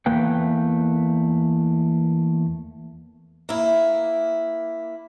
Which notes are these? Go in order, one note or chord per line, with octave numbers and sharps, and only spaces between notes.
E2 A3 A#3 B4 G5
A#3 E4